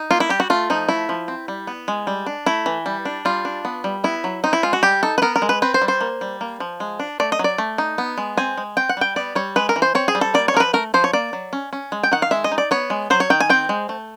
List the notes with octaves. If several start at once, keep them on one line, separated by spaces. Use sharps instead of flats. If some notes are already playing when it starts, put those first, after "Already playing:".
Already playing: D#4
A#3 F4
E4
G3 G4
F#4
A3 F4
F3 D#4
A3 E4
F3
C4
G3
B3
G#3
G3
D4
A3 E4
E3
G3
D4
G3 F4
D4
B3
G3
B3 E4
F#3
C4 D#4
E4
G#3 F4
F#4
G3 G4
D#4 A4
B4
B3 A#4
A#4
G#3
B4
C4 B4
C5
G3
C5
A#3
G3
A#3
F3
G#3
D4
A3 D5
D#5
F#3 D5
A3
D#4
B3
G#3
C4 G#5
G#3
C4 G5
F#5
G3 G5
B3 D5
G3 C#5
G#3 B4
A#4
E3
C5
C4 C#5
G#4
G3
A4
A#3 D5
C#5
F3 A#4
B4
A3 A#4
F3 C5
C#5
A#3 D5
F#3
C#4
C#4
G#3
G5
D#3 F#5
F5
G#3 E5
D#5
D#4
D5
B3 C#5
G#3
F#3 C5
C#5
D#3 G5
G#5
C4 G5
G#3
A3